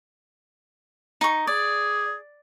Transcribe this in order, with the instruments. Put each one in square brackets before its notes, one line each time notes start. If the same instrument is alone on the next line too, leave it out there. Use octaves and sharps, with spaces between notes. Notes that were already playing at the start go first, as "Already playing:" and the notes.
[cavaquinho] D#4 C#6
[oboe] G#4 [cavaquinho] D5